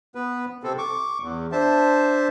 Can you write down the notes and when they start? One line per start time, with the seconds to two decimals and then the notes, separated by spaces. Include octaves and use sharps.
0.15 B3 B4
0.63 C3 C4 A4
0.78 C#6 D6
1.22 E2
1.52 D4 C5 E5 A5